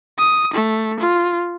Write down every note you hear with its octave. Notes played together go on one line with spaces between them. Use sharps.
D#6
A3
F4